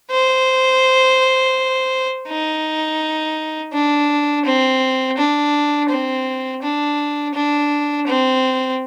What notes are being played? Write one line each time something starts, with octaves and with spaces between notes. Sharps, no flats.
C5
D#4
D4
C4
D4
C4
D4
D4
C4